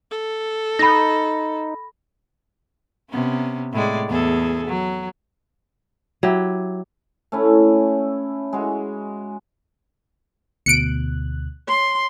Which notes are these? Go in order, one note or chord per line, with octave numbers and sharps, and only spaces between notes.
A4
D#4 B5 A#6
C3 B3 C#4
A2 G#3 D5
E2 G#4 A4
F#3
F#3 E4 G4
A3 C#4 E4
G#3 F#4
D2 B2 F#6 C#7 D7
C#5 C6